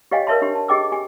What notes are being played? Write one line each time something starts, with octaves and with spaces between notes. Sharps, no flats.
G4 C#5 D#5 F5 G5 G#5
A#4 B4 C#5 E5 A5 C6
D4 G4 C6
A5
G4 G#4 D#5 G5 D6 E6
G4 G#5